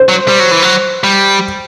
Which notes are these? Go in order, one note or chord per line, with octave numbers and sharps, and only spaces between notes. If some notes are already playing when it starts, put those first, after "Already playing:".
Already playing: C5
F#3
G3
F#3
E3
F#3
G3